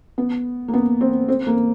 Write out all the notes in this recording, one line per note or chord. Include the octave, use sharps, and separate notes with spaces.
B3
A#3
B3
C4
C4
A#3